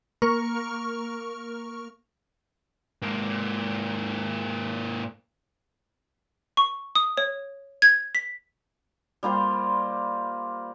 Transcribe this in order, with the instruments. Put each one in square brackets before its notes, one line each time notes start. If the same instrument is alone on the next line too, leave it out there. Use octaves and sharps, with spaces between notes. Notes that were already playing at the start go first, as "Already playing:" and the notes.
[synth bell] A#3 A#4 C#6 F6
[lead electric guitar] G#2 A#3
[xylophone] C#6
D#6
C#5
G#6
B6
[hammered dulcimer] G3 A#3 F4 C5